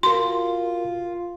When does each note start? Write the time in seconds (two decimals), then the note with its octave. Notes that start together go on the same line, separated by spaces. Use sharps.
0.03 F4 F#4 A#4 C6